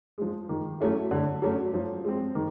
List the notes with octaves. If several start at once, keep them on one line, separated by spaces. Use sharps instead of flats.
F3 G#3
D#3
F#3 A3 C#4 E4
D3
F#3 A3 C#4
F3
G#3 C4
D#3